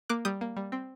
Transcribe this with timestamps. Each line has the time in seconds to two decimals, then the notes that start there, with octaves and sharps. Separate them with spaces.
0.09 A#3 D6 F#6
0.25 G3 D#6 G6
0.41 A#3
0.57 G3
0.72 C4